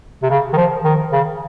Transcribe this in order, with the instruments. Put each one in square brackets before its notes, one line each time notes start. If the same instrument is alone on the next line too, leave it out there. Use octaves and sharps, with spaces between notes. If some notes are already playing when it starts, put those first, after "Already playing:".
[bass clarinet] C3
C#3
D#3
F3
D#3
C#3